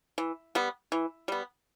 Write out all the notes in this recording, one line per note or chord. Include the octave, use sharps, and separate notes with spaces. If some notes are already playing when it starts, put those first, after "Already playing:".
E3
G3 B3
E3
G3 B3